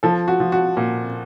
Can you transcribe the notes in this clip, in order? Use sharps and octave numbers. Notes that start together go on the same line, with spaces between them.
F3 A4
F#4
F3
F#4
A#2